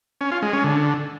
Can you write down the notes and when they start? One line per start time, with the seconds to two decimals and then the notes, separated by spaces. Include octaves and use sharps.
0.21 C#4
0.32 F4
0.42 G#3
0.53 C#4
0.64 D3